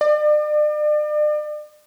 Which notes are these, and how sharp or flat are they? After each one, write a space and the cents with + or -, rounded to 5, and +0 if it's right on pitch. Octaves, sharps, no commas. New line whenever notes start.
D5 +40